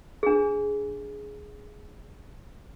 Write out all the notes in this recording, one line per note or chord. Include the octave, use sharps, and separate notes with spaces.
D4 G#4